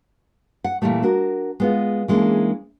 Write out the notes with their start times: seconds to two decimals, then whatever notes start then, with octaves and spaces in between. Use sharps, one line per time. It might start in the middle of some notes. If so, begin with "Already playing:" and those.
0.64 F#5
0.82 A#2 C#3 E3 G3 A3
1.03 D4 F#4 A#4
1.60 G#3 B3 F4
2.08 E3 G#3 A#3 C#4 D4